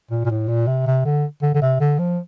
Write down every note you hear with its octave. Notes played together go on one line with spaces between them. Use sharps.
A#2
A#2
A2
A#2
C3
C3
D3
D3
D3
C3
D3
F3